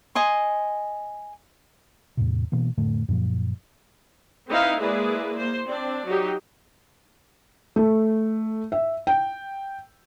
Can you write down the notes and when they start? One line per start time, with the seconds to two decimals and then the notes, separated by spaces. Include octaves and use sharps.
0.15 D#5 G#5 C6
2.17 E2 A2 C3
2.52 B2 E3 A#3
2.77 F2 A2 D3 A3
3.08 F#2 A#2 F3
4.49 C4 D#4 E4 B4 F5
4.79 G#3 A#3 E4 G#4 B4 D5
5.37 A#3 C5
5.66 C4 D4 D5
6.05 F#3 D#4 G4
7.76 A3
8.72 E5
9.07 G5